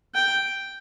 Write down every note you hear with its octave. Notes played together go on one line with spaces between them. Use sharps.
G5